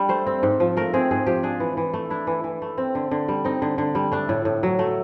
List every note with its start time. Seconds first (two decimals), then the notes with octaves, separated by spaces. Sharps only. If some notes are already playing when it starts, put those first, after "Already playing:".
Already playing: G3 D4
0.09 A3 C5
0.27 C4
0.43 G#2
0.60 F3
0.77 A3 A#4
0.94 C4 G#4
1.11 G#2 G#4
1.26 F3 G4
1.43 D4 G#4
1.60 E3
1.77 E3
1.94 A3
2.10 D4 E4
2.27 E3
2.44 E3
2.62 A3
2.78 C4
2.95 D3
3.11 D3
3.28 G3
3.45 C4 D#4
3.62 D3
3.78 D3
3.95 G3
4.12 A3 D4
4.29 A2
4.45 A2
4.63 F#3
4.79 A3